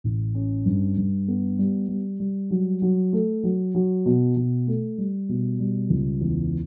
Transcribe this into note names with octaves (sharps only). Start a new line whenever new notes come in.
A1
C#4
G2
G2
B3
G3
G3
G3
F#3
F#3
A3
F#3
F#3
B2
B2
A3
G3
B2
G3
C#2
E2